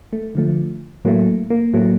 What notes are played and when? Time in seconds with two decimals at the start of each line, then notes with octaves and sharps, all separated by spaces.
0.13 A3
0.35 D3 F3 A3
1.05 A2 F#3 A3 A#3
1.50 A#3
1.74 A2 F#3 A3 A#3